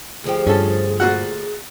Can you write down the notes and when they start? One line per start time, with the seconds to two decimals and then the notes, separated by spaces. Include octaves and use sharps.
0.24 D2 F3 G4 G#4
0.47 G2 C#4 A4
1.00 A#2 F#4 F#5